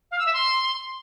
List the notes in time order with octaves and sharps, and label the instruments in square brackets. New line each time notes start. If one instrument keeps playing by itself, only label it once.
[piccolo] F5
E6
E5
C6